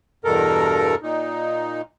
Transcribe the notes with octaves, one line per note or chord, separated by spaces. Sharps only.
E2 G2 B2 A4 A#4
A#2 D#4